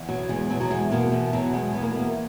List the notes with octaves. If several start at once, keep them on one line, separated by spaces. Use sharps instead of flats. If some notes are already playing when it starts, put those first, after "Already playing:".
Already playing: E2
B2 F#3
E2 G#3
B2 F#3
F#3
E2 G#3
B2 A#3
E2
B2 F#3
E2 G#3
B2 B3
A#3
G#3
E2 A#3